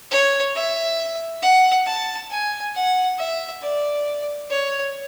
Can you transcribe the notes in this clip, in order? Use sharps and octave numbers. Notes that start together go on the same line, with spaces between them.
C#5
E5
F#5
A5
G#5
F#5
E5
D5
C#5